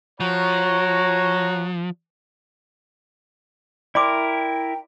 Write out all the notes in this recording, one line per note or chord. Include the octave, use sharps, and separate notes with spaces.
F3 F#4 C#5 A#5
E4 A#4 D5 G5 C6 D6